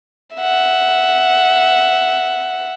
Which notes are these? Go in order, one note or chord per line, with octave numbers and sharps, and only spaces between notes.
E5 F#5